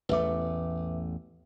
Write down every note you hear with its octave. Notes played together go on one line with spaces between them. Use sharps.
A1 E2 A3 B4 E5 D6